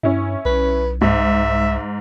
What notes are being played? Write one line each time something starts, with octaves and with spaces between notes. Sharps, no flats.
G2 C#4 E4
B1 B4
C2 G#2 E5